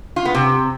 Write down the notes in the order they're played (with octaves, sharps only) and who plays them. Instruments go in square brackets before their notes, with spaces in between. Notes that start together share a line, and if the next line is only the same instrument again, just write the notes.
[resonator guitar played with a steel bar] F4
B3
C3